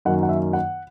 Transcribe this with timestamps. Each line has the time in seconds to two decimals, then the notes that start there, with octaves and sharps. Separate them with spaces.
0.05 F#2 D#3 F#3 A#3 F#5
0.23 F#5
0.29 E5
0.53 F#5